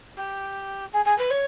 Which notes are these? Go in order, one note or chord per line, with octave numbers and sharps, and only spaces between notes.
G4
G#4
G#4
B4
C#5